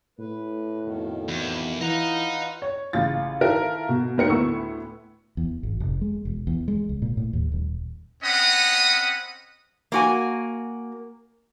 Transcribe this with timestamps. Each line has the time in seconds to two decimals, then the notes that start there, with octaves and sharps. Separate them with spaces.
0.19 A2 B4
0.82 F2 B2 D#3
1.28 E2
1.81 E3 F4 B4 D#5 F#5 A#5
2.62 C#5
2.93 A1 C#3 F4 A6
3.41 D#3 E4 F4 A4 A#4
3.89 B2
4.17 F#1 G#2 A#4 C#7
4.29 D2 A2 B3 C#6 E6
5.37 E2
5.63 G#1
5.80 F1
6.01 G#3
6.25 E1
6.47 E2
6.68 G#3
6.89 C#2
7.02 A#2
7.17 A2
7.33 D#2
7.52 D#1
8.22 C4 C#4 D#5 F#5 B5 D#6
9.92 A#3 F#4 G#5